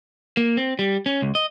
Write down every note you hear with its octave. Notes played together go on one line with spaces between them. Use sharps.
A#3
C4
G3
C#4
C#2
D#5